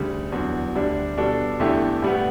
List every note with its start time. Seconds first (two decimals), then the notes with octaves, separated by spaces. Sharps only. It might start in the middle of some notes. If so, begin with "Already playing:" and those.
Already playing: D2 C#3 G3
0.32 E2 D3 F#3
0.75 D2 D3 G3 D4
1.17 B2 G3 D4 A4
1.60 E2 D3 A3 E4 G4
2.02 A2 G3 B3